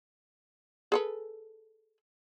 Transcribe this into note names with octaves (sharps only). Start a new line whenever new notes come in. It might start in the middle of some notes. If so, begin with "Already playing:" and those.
G#4 A4 B4